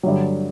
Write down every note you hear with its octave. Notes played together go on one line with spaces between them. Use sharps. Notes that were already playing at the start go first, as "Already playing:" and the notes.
G2 D3 F#3